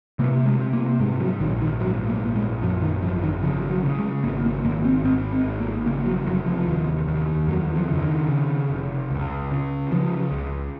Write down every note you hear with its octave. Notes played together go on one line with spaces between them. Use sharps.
C3 A#3
G#3
C3
A#3
G#2 G#3
F#3
A#1 D#3
D#3
G#2 F#3
A#3
A#1
G#3
F#2 F3
D#3
G#1 F3
D#3
C#3 F3
F#3
C#3
G#3
G#1 A#3
A#3
G#1 A#3
C4
G#2 C4
C4
G#1
A#3
C#3 A#3
F#3
F1 F#3
F3
D#2
D#2
F2 F#3
F3
C#3
D#3
C#3
F1
C#2
C#3
C#3 F3
C#2